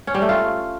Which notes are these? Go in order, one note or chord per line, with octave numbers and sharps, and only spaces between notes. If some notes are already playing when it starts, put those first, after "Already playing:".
C#4
G3
A3
F4